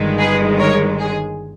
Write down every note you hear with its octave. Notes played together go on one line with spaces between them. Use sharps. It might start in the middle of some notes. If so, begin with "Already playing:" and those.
Already playing: G1 G2 D#3 G#3
G#4 B4
A#4 C#5
G#4